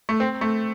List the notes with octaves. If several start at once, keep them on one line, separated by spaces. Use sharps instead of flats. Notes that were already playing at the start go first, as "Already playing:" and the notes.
A3
C4
A3